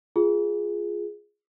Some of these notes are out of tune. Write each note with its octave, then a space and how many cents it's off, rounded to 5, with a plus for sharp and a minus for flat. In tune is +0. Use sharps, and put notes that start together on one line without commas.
F4 +0 G#4 +0